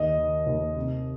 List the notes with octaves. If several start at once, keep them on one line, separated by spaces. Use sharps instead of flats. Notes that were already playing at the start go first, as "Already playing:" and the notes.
Already playing: D#2 D#5
D#3
D#2
C3